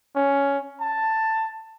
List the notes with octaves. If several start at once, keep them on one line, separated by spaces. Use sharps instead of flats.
C#4
A5